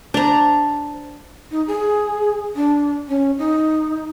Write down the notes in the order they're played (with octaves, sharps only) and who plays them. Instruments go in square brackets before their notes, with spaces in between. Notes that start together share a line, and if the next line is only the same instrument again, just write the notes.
[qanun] D4 A#5 [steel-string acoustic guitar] C5 A5
[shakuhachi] D#4
G#4
D4
C#4
D#4